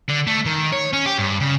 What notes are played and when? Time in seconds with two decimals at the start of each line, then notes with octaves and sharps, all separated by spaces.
0.09 D3
0.27 A3
0.46 D#3
0.73 C#5
0.93 C#4
1.06 G4
1.18 G2
1.40 C#3